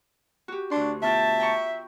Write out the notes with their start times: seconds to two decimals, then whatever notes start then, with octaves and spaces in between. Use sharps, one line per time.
0.48 F#4 G4
0.71 D2 D4 C6
1.02 B2 F4 E5 G5 A5
1.39 G5 A#5 C#6